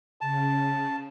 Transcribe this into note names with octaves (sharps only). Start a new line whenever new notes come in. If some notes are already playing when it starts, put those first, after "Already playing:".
C#3 A5